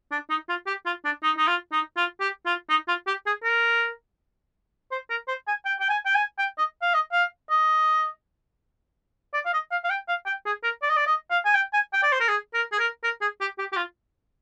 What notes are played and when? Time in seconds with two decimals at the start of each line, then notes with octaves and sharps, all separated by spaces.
0.11 D4
0.30 D#4
0.49 F4
0.67 G4
0.86 F4
1.05 D4
1.23 D#4
1.38 D#4
1.47 F4
1.72 D#4
1.97 F4
2.20 G4
2.46 F4
2.70 D#4
2.88 F4
3.07 G4
3.26 G#4
3.43 A#4
4.91 C5
5.10 A#4
5.28 C5
5.47 G#5
5.65 G5
5.80 G5
5.90 G#5
6.06 G5
6.15 G#5
6.39 G5
6.58 D#5
6.82 F5
6.94 D#5
7.12 F5
7.50 D#5
9.34 D5
9.45 F5
9.53 D#5
9.71 F5
9.84 F5
9.90 G5
10.08 F5
10.26 G5
10.45 G#4
10.63 A#4
10.82 D5
10.89 D#5
10.97 D5
11.06 D#5
11.30 F5
11.45 G#5
11.55 G5
11.73 G#5
11.93 G5
12.03 D5
12.12 C5
12.20 A#4
12.29 G#4
12.54 A#4
12.72 G#4
12.79 A#4
13.04 A#4
13.21 G#4
13.40 G4
13.58 G4
13.72 G4
13.76 F4